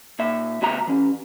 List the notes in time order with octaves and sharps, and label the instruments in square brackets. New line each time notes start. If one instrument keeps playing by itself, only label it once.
[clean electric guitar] A#2 E5
D2 B2 F#4 E5 A#5
E3 C#4